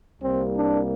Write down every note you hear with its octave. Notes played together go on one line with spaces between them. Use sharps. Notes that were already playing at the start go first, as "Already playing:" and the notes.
C2 C3 G3 A#3 C4
D4